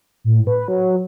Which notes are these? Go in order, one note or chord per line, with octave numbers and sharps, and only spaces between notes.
A2
B4
F#3